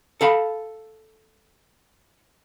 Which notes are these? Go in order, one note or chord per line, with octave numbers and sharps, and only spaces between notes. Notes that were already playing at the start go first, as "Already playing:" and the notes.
A4 F5 B5